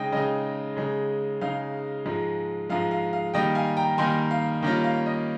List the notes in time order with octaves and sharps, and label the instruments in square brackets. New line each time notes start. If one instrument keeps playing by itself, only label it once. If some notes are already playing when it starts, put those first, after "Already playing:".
Already playing: [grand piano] C#3 G#3 D#4 D#5 G5
C#3 G#3 D#4 D#5
C#3 G#3 D#4
C#3 G#3 D#4 F5
G#2 F3 G#3
G#2 F3 G#3 F5
F5
F5
D#3 G3 A#3 D#4 D#5 G5
F5 G#5
G5 A#5
D#3 G3 A#3 D#4 G#5 C6
F5
D#3 G3 A#3 C#4 F4
F5
D#5